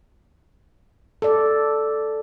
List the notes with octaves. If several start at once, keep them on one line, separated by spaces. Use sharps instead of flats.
A4 D5